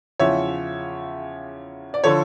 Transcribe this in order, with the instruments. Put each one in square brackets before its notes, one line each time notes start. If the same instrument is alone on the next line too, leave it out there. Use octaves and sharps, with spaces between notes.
[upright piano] E2 C#3 F3 C#5 E5
D5
D3 F3 A4 C#5